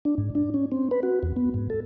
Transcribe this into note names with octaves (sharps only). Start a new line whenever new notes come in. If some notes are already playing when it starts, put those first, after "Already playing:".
D4
G#2
D4
C#4
C4
B4
F#4
E2
B3
G#2
A4